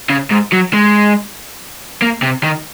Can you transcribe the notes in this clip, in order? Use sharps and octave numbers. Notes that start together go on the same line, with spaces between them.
C#3
G#2
F#3
G#3
A#3
C3
D#3